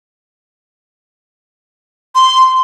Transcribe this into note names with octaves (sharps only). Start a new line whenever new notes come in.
C6